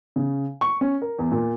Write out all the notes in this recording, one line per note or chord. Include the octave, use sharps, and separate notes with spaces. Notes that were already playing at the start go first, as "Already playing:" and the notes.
C#3
C#6
C#4
A#4
E2
A#2